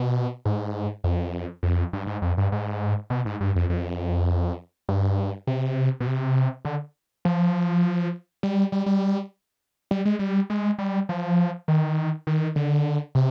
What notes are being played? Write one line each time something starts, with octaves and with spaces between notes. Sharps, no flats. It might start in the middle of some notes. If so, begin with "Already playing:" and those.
Already playing: B2
G#2
F2
F2
G2
G#2
F2
G2
G#2
B2
G#2
G2
F2
F2
G2
C3
B2
C3
D3
F3
G3
G3
G3
G3
G#3
G3
G#3
G3
F3
D#3
D#3
D3
C3